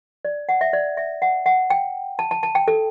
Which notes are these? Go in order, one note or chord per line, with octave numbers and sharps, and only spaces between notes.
D5
F#5
E5
D5
E5
F#5
F#5
G5
A5
A5
A5
G5
A4